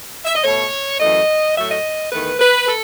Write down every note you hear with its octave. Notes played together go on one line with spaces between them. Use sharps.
E5
D#5
B2 A3 C#5
F#2 E3 A3 D#5
A2 F#3 A3 E5
D#5
E2 D#3 A3 B4
B4
A4